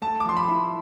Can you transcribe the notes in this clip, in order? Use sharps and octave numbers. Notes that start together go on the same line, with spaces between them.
A3 A5
D6
F3 C6
B5
E4